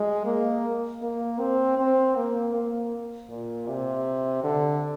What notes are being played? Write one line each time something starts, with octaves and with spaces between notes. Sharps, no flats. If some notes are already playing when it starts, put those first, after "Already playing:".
Already playing: G#3
A#3
A#3
C4
C4
A#3
A#3
A#2
C3
D3